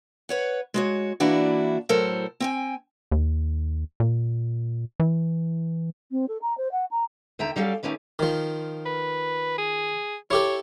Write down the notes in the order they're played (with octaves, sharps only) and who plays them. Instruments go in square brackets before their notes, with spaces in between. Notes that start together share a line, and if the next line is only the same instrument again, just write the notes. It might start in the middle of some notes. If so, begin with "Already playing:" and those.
[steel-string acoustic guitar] B4 C#5 F#5
G#3 F#4 C#5
E3 A#3 D4 E4 F#4 D5
A2 F#3 A4 A#4 C5
C4 G5 G#5
[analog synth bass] D#2
A#2
E3
[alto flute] C4
A4
A#5
C5
F#5
A#5
[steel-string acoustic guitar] D#2 D3 E5 G5 A#5
F#3 G3 C#4 A4 F5
D#3 F#3 A3 C#4 G4 B4
[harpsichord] D#3 F3
[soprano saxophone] B4
G#4
[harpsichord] E4 G4 A4 [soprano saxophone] C#5